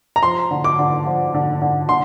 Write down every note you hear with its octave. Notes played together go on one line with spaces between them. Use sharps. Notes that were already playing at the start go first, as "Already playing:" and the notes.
A#5
F3 C6
D3
D6
D3
F3
D3
D3
D3 C6